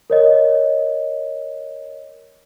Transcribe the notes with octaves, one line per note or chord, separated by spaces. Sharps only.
A#4 C#5 D#5